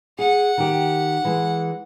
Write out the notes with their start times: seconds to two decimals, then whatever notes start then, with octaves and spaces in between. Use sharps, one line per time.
0.19 G#4 F#5
0.58 D#3 G4
1.25 E3 G#3